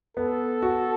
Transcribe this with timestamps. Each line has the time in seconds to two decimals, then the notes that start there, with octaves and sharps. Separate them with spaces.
0.17 B3 A4
0.62 F#4